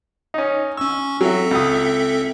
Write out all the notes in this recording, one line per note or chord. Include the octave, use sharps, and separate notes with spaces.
C#4 D#4
C#4 C#6 E6
F#3 C4 A4 E5
C#2 D#6